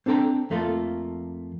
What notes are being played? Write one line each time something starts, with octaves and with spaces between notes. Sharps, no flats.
C4 D4 A4 G5 A#5
F2 A3 A#3 F4 A4